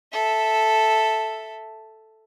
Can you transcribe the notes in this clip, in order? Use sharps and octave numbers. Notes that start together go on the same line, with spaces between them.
A4 E5